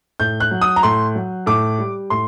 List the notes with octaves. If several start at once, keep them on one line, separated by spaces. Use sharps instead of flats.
A2 G6
F#6
F#3
D#6
A#5
A2 C6
F#3
A2 D6
G3
A2 C6